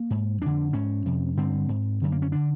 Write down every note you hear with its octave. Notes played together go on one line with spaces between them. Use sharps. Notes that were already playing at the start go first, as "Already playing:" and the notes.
Already playing: A#3
G#2
F2 D3 D4
G#2 C#4
F2 C3
G2 D3 C4
G#2
F#2 D3
A#3
C#4
D3 D4